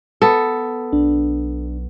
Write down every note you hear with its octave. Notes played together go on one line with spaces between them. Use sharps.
B3 A4
B1 D4